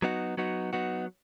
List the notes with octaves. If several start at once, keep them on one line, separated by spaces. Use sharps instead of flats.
F#3 B3 D#4 F#4
F#3 B3 D#4 F#4
F#3 B3 D#4 F#4